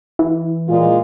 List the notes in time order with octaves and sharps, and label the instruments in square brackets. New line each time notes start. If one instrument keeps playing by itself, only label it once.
[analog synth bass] E3
[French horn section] A#2 G#3 F4